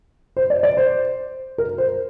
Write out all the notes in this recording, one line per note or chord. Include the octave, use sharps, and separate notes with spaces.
C5
D5
D5
C5
A#4
C5